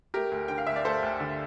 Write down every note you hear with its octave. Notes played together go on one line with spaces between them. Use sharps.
A3 G4 A#4
D2
D3 G5
F5
D2 E5
D5
A3 A4 C5
D2
D3